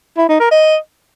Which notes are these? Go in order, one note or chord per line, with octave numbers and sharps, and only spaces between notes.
E4
D#4
A#4
D#5